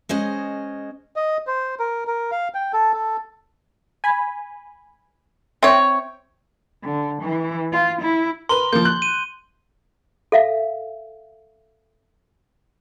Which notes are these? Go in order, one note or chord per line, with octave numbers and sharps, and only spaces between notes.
G#3 C#4 C5 D#5
D#5
C5
A#4
A#4
F5
G5
A4
A4
G#5 B5
C4 C#5 E5 G5
D3
E3
F4
E4
A#4 B4 C6 G7
F3 A#3 G6
F#6
D#7
A4 E5 F5